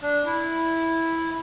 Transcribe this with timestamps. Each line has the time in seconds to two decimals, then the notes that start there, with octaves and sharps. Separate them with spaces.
0.02 D4
0.26 E4